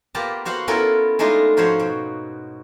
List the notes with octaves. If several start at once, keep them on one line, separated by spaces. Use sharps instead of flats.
A#3 B3 F4 G4 A5 A#5
B3 F#4 C5 F5 F#5
B3 C#4 E4 F4 A4 A#4
G#3 A3 D4 D#4 F4
G#2 F3 F#4 C5 C#5 F5
B2